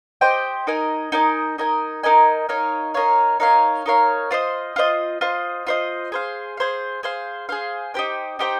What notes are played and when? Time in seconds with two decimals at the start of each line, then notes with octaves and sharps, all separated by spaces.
0.21 G4 C5 D#5 G5
0.67 D#4 A#4 D#5 G#5
1.12 D#4 A#4 D#5 G#5
1.58 D#4 A#4 D#5 G#5
2.03 D#4 A#4 D#5 G#5
2.49 D#4 A#4 C#5 F5
2.94 D#4 A#4 C#5 F5
3.40 D#4 A#4 C#5 F5
3.86 D#4 A#4 C#5 F5
4.31 F4 C5 D#5
4.76 F4 C5 D#5
5.21 F4 C5 D#5
5.67 F4 C5 D#5
6.12 G#4 C5 F5
6.57 G#4 C5 F5
7.03 G#4 C5 F5
7.49 G#4 C5 F5
7.94 D#4 G4 C5 G5
8.39 D#4 G4 C5 G5